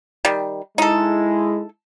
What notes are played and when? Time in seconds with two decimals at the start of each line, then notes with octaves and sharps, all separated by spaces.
0.25 D#3 G3
0.78 G#3 D#4 E4 A4